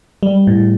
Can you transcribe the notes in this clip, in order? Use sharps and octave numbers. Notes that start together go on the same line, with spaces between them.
G3
A2